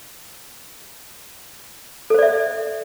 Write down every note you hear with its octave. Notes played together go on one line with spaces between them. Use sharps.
A4 C5 D5 E5